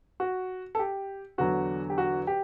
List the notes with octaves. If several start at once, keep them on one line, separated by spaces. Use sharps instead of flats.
F#4
A4
G4
E2 D3 F#3 F#4
G4
F#4
G4